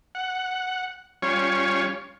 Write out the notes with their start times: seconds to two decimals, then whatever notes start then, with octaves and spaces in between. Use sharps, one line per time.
0.15 F#5
1.22 G3 C#4 F4 C#5